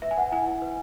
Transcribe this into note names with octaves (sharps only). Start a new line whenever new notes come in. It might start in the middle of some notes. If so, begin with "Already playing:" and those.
B4 E5
G#5
B4 F#5
E4 G#5
E4
B4